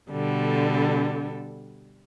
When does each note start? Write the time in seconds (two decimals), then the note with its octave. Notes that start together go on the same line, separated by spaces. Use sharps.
0.10 B2 D3 G3 A4